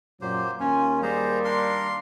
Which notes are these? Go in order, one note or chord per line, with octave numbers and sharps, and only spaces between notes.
F#2 A#2 F#3 A#3 G4 C5
D#2 A#3 C#4 F4 G#5
G3 G#4 C5 A#5
D4 A#4 F5 C6